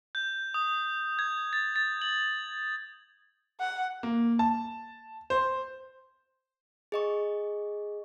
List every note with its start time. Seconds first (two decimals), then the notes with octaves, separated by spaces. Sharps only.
0.15 G6
0.54 D#6
1.19 G#6
1.53 A6
1.76 A6
2.02 F#7
3.60 F#5
4.03 A#3
4.39 A5
5.30 C5
6.92 G#4 D#5 C#6